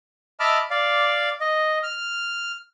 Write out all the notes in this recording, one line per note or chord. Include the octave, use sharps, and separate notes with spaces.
D#5 E5 A5 B5 D6 F6
D5 F5
D#5
F6